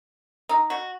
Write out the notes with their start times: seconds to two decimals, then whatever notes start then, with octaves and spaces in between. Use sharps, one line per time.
0.49 D#4
0.70 F#4